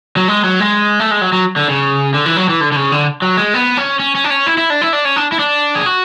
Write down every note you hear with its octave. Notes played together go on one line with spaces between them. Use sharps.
F#3
G#3
F#3
G#3
A3
G#3
F#3
F#3
D3
C#3
D3
E3
F#3
E3
D3
D3
C#3
D3
F#3
G#3
B3
C#4
C#4
C#4
D4
C#4
E4
E4
D4
E4
D4
C#4
D4
E4
D4
G#4
F#4